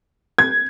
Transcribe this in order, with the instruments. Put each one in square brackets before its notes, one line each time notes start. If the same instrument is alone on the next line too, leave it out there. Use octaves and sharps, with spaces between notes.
[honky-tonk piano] G#6